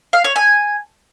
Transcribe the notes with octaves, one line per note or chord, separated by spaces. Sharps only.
F5
C#5
G#5